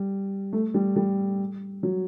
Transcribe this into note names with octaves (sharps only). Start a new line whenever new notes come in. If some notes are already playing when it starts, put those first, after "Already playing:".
Already playing: G3
A3
G3
G3
F#3